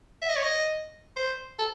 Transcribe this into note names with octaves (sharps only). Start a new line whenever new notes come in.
E5
D#5
C#5
D#5
C5
A4